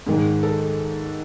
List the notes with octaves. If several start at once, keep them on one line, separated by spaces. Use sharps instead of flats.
G#2 D#3 G#3
A4